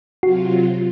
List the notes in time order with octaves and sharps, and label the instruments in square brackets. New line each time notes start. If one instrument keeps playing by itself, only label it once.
[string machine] C3 F#3 F4 [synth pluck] F#4